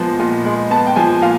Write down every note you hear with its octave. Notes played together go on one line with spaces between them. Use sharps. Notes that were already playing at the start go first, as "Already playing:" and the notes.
Already playing: A#2 F3 G#3 B3
A#2
G#3
B3 A5
G5
F3 G#5
A#2 F5